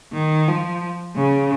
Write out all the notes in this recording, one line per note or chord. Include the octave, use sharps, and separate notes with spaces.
D#3
F3
C#3